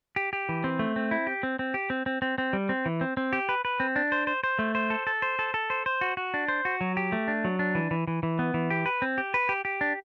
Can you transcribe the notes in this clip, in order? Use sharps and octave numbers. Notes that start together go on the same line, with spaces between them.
G4
G4
E3
C4
A3
C4
E4
G4
C4
C4
G4
C4
C4
C4
C4
G3
C4
E3
C4
C4
G4
B4
B4
C4
D4
C5
C5
C5
A3
C5
A4
A4
C5
A4
A4
C5
C5
F#4
F#4
D4
C5
F#4
F#3
G4
A3
D4
F#3
D4
E3
E3
E3
E3
B3
E3
G4
B4
C4
G4
B4
G4
G4
D4